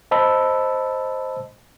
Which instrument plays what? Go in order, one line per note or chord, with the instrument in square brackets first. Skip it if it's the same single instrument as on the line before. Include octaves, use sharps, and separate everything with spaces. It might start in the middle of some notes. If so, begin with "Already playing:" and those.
[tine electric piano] C5 D#5 A5 B5 E6